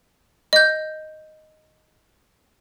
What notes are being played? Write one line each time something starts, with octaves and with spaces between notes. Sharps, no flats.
D#5 G6